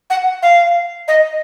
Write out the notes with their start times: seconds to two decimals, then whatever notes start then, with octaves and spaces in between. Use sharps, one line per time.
0.10 F#5
0.42 F5
1.08 D#5